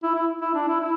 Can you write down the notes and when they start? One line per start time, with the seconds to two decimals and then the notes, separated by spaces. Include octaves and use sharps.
0.03 E4
0.15 E4
0.42 E4
0.55 D4
0.68 E4
0.81 E4